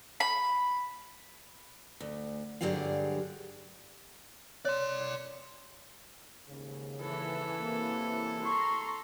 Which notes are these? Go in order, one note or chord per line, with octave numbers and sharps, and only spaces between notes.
B5
D2
G2 D3 F#3 G4 G#4 F5
C#5 D5 C6
D#2 G#2 C#3
E3 A4
C3 F#3 A#3
A#5 C6 C#6